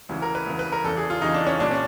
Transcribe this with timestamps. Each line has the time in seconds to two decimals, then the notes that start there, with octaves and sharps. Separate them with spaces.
0.09 D2 C#3 E3
0.22 A#4
0.35 B4
0.47 D2 C#3 E3
0.59 B4
0.72 A#4
0.84 E2 C#3 E3 A4
0.97 G#4
1.10 F4
1.21 E2 C#3 E3 D#4
1.34 D4
1.47 C#4
1.59 C2 A#2 D4
1.71 C#4